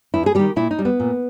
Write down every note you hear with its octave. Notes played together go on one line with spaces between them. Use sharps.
E2 E4
G#4
D#3 G3 G4
A#2 E4
D#4
G3
B3
A#2